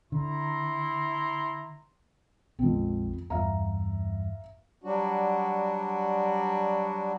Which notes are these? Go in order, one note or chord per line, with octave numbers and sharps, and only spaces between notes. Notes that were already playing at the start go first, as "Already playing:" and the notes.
D3 E4 A#5 C6
A#1 F2 G#3 C4
E2 G2 E5 F5 A#5
F#3 G3 D4 F#4